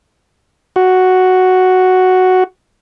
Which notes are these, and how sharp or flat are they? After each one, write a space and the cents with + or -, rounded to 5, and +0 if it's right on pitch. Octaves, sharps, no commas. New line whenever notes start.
F#4 +0